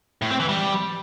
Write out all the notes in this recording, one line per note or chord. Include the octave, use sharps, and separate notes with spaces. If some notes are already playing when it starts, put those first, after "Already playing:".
A2
C4
E3
G3